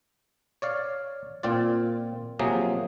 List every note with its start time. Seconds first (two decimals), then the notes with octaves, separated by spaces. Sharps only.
0.62 C#5 D5 F5
1.43 A#2 C4 F4 D5
2.39 C3 F3 F#3 A#3 G#4